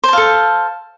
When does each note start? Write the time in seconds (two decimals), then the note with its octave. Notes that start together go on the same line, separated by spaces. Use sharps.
0.04 C5
0.08 A5
0.13 F5
0.17 A4